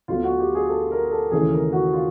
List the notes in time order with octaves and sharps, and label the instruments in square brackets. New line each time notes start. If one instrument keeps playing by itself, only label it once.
[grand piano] D2 D3 F#3 B3 [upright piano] F4
[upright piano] F#4
G4
G#4
A4
A#4
A4
[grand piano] D#2 C#3 E3 A3 [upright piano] G#4
[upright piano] A#4
F#4
F4